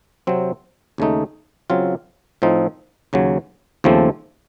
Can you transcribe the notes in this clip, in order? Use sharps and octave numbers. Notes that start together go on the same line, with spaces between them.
C3 F#3 C4
D#2 C#3 A3 D#4
C#3 F#3 C4 F4
A2 F3 C4 D#4
D#2 C#3 F#3
D#2 C#3 F3 A3 C4